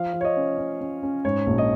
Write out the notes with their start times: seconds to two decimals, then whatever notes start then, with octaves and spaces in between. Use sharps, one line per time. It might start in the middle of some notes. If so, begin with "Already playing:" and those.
Already playing: F3 F5
0.13 F3
0.21 C#5
0.25 D#5
0.37 C#4
0.58 C#4
0.81 C#4
1.03 C#4
1.25 G#2 C#5
1.46 A#1
1.58 D#5